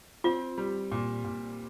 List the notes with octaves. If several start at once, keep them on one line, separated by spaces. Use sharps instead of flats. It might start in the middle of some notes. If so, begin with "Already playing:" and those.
C4 F4
G3
A#2
A#2